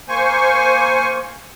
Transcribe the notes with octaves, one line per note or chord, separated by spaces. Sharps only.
A#3 C5 G#5 C#6